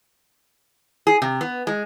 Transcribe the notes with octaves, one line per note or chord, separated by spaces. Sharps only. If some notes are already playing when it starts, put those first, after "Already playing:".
G#4
C3
B3
G#3